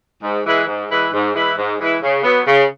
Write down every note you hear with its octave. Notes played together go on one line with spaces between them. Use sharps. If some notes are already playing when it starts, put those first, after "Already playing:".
G#2
E3 G#3 E4 B4
G#2
E3 G#3 E4 B4
G#2
E3 G#3 E4 B4
G#2
E3 G#3 E4 B4
C#3
F#3 B3
C#3